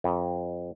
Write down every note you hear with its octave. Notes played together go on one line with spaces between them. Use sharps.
F2